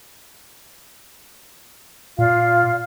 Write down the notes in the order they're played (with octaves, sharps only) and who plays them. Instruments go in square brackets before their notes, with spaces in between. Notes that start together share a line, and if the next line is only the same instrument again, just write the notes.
[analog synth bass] A#2 [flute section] F4 D5 F5